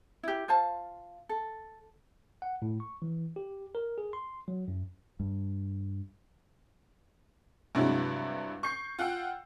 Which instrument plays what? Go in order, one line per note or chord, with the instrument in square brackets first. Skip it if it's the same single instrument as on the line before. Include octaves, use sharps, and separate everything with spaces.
[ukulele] E4 G4
F4 C5 F5 A5
A4
[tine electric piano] F#5
A2
C#6
E3
G4
A#4
G#4
C6
F#3
F#2
[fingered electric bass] G2
[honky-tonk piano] G2 C3 F#3 G#3 D4 E4
C#6 G6 C7
F4 F#5 G5 E6